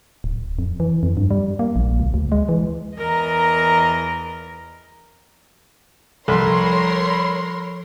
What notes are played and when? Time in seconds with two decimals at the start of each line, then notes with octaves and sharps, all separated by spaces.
0.24 D1
0.59 F2
0.80 E3
1.03 F2
1.17 G2
1.31 G3
1.59 A#3
1.76 A#1
2.00 C#2
2.14 D2
2.32 G#3
2.49 E3
2.96 E2 A#4 D#5 A#5
6.28 C2 F3 A4 A#4 C#5 B5 C6